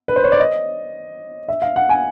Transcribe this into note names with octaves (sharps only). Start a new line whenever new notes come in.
B4
C5
C#5
D5
D#5
E5
F5
F#5
G#5